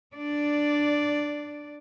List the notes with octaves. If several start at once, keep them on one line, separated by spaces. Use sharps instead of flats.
D4 D5